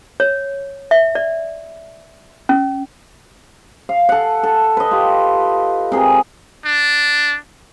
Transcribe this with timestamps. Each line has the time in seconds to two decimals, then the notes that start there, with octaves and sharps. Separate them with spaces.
0.20 C#5
0.91 E5
1.15 D5
2.49 C#4
3.89 F5
4.09 A4 F#5
4.43 A4
4.77 B4 D#5
4.91 F4 G4
5.92 C3 G#4 A#4
6.65 D4